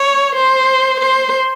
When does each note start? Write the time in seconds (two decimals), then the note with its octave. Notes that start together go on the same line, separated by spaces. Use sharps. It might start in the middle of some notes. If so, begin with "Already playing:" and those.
Already playing: C#5
0.35 C5
0.99 C5